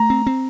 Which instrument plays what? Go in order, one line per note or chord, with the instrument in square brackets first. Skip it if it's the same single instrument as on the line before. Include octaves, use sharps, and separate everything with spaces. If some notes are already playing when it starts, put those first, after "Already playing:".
Already playing: [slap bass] A3 [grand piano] A#5
[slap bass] C4
C4